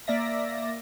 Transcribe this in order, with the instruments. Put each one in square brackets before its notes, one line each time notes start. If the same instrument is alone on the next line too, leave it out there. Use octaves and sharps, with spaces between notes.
[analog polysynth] A#3 D5 E5 A#6